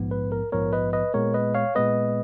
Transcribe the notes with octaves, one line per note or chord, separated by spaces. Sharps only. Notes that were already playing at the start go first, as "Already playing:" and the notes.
Already playing: A#1 G#2 F3 B3
B4
A#4
A#1 G#2 F3 B3 A#4 C#5
B4 D#5
B4 D#5
A#2 G#3 B3 A#4 C#5
B4 D#5
C#5 F5
A#2 G#3 B3 B4 D#5